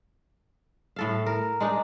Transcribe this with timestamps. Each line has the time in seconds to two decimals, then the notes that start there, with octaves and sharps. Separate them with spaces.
0.96 A2 A4 F5
1.26 A#4
1.61 G#3 D4 D#4